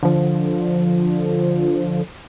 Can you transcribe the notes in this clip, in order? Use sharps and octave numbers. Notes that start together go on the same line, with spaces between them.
D3 F3